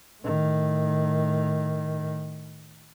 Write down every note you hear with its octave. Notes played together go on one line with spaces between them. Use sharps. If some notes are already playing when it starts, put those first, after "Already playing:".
A2 D#3